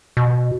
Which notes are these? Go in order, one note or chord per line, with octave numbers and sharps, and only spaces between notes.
B2